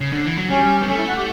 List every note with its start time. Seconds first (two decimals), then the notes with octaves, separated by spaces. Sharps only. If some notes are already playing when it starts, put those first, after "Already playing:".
0.01 C#3
0.12 D3
0.26 E3
0.38 F#3
0.49 G3 C#4
0.82 B3
0.88 A3 C#4
0.98 E4
1.07 F#4
1.17 G4